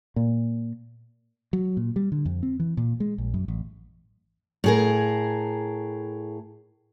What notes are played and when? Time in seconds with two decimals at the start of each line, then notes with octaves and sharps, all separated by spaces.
0.16 A#2
1.53 F#3
1.77 A#2
1.96 G3
2.12 D3
2.25 F2
2.43 C4
2.60 E3
2.77 A#2
3.00 G#3
3.18 A#1
3.34 F#2
3.48 A1
4.64 A2 G#4 A#4